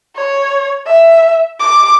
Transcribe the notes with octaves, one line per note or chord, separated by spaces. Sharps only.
C#5
E5
D6